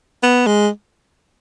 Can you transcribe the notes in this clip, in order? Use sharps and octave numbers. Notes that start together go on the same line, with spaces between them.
B3
G#3